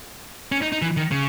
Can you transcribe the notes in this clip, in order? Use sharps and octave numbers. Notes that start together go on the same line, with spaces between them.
C#4
D#4
D#4
E3
D#3
C#3